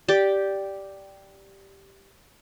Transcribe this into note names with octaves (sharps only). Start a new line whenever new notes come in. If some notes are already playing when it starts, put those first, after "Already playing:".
G4 D5